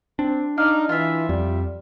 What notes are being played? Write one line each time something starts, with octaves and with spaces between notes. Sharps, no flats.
C4 D4
D#4 D5 F5
E3 F4 E5
F2 G3